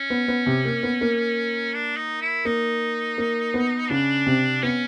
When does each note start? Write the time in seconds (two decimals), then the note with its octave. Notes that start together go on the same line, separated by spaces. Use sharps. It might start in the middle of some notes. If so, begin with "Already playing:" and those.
Already playing: C#4
0.10 B3
0.28 B3
0.46 C3 C4
0.65 A#3
0.83 B3
1.01 A#3
1.74 D4
1.97 D#4
2.21 E4
2.45 A#3 D#4
3.18 A#3
3.54 B3
3.90 C#3 C#4 D4
4.26 C3 C4
4.63 B3 C#4